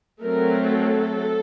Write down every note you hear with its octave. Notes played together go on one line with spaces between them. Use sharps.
F#3 A3 C4 A#4
A4